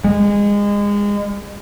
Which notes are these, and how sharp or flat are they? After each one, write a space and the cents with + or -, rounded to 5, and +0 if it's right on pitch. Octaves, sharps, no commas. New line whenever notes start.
G#3 -25